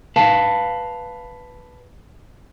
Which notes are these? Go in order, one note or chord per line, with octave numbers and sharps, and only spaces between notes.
B4 F5 A5